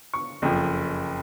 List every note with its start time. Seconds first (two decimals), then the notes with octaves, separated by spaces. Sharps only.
0.14 C#6
0.42 F#1 F2 F3